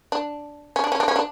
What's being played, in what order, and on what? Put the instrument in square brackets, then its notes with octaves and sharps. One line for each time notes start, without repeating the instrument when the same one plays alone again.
[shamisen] D4
C#4
D4
C#4
D4
C#4
D4